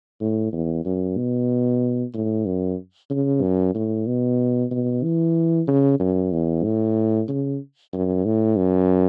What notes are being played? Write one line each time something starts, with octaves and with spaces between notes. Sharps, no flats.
A2
E2
F#2
B2
A2
F#2
C#3
F#2
A2
B2
B2
E3
C#3
F#2
E2
A2
C#3
F#2
A2
F#2